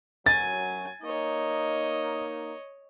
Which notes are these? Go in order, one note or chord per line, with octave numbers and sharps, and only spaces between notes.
F#2 F#3 G#5 A6
A#3 D#4 C#5 D#5